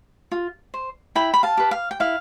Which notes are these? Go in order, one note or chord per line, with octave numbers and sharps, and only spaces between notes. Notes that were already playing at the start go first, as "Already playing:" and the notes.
F4
C5
E4 G5 B5
B5
F5 A5
G4 B4
F5
G5
E4 F5